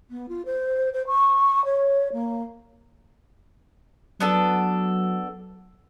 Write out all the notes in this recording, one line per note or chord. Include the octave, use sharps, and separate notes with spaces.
B3
F4
C5
C5
C#6
C#5
A#3
F#3 B3 D4 A4